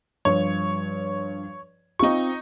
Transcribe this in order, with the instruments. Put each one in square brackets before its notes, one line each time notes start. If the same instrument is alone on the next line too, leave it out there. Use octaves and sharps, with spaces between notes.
[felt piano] G2 F3 [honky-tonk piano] C#5
[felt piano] C4 F4 [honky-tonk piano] D#4 C#6